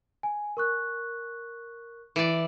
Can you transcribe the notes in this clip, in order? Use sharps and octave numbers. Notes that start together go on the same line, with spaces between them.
G#5
A#4 C#6 F#6
E3 D5